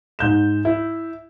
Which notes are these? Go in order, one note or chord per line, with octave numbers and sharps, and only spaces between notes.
G#2 G6 E7
E4